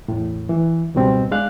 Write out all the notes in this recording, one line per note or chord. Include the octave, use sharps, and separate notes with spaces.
E2 A2
E3
C#2 G#2 B2 G3 C4
G#3 D4 F5 F#6